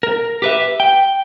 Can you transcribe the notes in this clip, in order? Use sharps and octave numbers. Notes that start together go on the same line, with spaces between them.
A#4
G4 B4 E5
G5